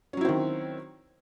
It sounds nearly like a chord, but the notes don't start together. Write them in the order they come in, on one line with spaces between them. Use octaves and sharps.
C#4 F#3 E4 C4 D#3